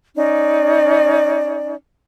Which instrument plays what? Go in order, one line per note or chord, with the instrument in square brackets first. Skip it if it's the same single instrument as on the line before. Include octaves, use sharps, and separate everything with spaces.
[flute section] C#4 D#4 D5